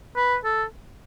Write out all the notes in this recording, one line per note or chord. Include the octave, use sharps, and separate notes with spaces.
B4
A4